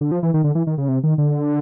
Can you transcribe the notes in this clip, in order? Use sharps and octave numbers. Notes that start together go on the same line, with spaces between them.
D3
F3
E3
D#3
D3
E3
D#3
C#3
C3
D#3
D3